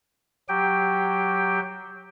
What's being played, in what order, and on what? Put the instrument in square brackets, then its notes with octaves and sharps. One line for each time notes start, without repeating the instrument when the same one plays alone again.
[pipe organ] F#3 G4 G5